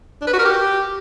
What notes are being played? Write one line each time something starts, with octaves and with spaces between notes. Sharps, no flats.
D4
B4
F#4
A#4
G4